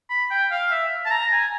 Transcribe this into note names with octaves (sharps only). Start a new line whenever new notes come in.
B5
G5
F5
E5
A5
A#5
G#5